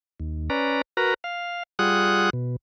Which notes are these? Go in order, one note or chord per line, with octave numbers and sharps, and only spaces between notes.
D#2
C#4 B4 D5 A#5
F#4 A#4 B4 A#5
F5
G3 F4 G#4 F#5 D#6 F#6
B2